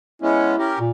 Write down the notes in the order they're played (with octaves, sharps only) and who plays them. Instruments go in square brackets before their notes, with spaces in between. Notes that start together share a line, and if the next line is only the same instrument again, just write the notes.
[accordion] G#3 B3 C#4 [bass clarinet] E4
[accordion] C#4 G4 A#4
[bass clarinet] A#2